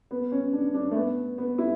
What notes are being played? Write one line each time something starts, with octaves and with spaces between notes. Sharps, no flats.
B3
C#4
D4
D4
A3
B3
B3
E4